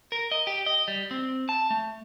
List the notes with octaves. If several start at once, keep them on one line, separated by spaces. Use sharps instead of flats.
A#4
D#5
G4
D#5
G3
C4
A5
A3